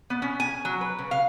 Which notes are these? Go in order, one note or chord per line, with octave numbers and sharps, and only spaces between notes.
B3
C#4
G#5
F#3
B4
C#3
F5